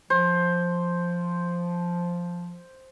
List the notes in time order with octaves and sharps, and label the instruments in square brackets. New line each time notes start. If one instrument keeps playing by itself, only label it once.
[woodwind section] F3 [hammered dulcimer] C5